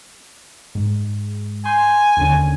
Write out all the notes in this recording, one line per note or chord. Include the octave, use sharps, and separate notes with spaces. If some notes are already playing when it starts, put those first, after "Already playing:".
G#2
G#5 C6 G6
D#2 D3 C#4